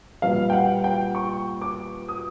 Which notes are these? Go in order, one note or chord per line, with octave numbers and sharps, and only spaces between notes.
A#2 G3 B3 F5
G5
F#5
G5
C#6
D6
D#6